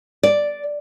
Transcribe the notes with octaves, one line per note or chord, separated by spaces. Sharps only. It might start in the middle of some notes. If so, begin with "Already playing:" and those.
D5